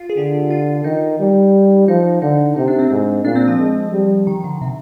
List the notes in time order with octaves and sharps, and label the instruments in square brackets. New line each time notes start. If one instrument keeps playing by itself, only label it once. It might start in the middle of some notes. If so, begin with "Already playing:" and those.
Already playing: [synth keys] F4
G#4
[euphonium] D3 [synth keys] G4
[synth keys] F4
[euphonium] D#3 [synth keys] D#4
[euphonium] G3
[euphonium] F3 [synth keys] D#4
[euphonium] D3 [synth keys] D#4
[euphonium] C3 [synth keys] D#4
[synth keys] D4
C4
[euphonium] G#2
[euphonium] A#2 [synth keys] D4
[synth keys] C4
F3
[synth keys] F3 [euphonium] G#3
[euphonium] G3
[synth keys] D#3
D3
C3